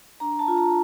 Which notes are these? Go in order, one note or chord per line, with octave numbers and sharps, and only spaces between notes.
D4 A#5
A5
F4
A#5